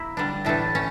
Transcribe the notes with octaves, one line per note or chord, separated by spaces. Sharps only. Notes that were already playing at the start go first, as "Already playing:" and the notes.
Already playing: A#3 E4
D3 G3 D4
A2 E3 A3 D4 A4
C#4